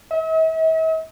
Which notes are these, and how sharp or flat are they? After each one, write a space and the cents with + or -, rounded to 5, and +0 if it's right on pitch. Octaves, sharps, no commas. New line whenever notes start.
E5 -45